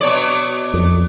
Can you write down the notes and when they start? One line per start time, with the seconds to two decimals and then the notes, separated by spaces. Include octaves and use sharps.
0.01 B2 C#5 D5
0.74 F2